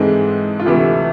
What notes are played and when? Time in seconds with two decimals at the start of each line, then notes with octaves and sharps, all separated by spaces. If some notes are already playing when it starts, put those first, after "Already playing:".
Already playing: G#2 E3 G#3 C4 A4
0.60 F4
0.66 D2 C3 E3 A3 E4